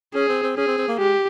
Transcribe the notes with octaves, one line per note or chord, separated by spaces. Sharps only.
C#4 G#4
C4
C4
C#4 G#4
C4
C4
A#3
G#3 G4